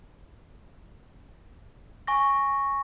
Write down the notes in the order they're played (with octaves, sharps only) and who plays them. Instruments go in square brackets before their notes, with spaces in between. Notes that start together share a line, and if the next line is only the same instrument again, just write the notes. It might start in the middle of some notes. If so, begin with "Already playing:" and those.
[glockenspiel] G#5 C#6 A#6